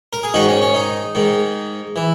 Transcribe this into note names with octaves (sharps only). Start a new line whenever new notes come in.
A#4
G#4
G#2 D#3 D#4 F#4
C#4
C#4
D#4
G#2 D#3
E3